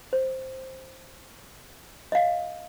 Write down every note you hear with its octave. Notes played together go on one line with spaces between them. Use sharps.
C5
D#5 F5